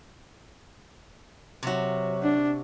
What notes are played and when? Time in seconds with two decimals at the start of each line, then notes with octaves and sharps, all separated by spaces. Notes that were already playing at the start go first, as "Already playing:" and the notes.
1.63 C3 F#3 F#4
2.23 D4